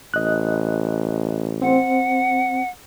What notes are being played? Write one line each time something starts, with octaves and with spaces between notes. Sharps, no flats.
A1 D#5 F#6
C4 C5 F#5